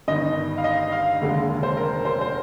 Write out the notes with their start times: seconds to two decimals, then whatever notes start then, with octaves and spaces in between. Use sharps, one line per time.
0.08 G1 G2 D#3 D#5
0.58 F5
0.64 D#5
0.92 F5
1.21 F1 D#2 D3 G#3
1.63 C5
1.77 A#4
2.05 C5
2.21 C5